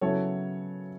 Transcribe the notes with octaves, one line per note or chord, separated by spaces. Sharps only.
C#3 F#3 B3 E4 A4 C#5